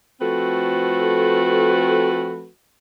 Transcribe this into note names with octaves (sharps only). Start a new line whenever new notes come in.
F3 A3 C4 F#4 A4 B4